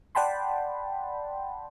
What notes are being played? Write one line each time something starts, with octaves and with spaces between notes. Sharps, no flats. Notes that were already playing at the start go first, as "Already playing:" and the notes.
D5 F#5 G5 A5 B5 C6